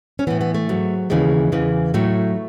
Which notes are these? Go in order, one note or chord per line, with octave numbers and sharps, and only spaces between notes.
C#4
A2 E3 B3
B3
A3
G#2 F#3
D#2 C#3 E3 G#3
E2 C#3 E3
A2 F#3 A3